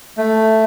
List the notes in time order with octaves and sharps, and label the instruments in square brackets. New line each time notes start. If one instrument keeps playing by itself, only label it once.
[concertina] A3